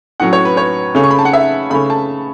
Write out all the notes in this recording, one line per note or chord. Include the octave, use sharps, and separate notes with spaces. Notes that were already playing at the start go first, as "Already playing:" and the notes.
A2 F#3 C#4 F#5
C#5
B4
C#5
C#3 A3 C#4
C#6
B5
A5
F#5
E5
C#3 A3 C#4 B5
A5